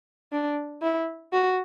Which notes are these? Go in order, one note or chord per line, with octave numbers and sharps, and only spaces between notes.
D4
E4
F#4